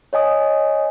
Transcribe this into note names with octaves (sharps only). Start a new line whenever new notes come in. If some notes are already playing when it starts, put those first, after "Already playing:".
C#5 D#5 G#5 D#6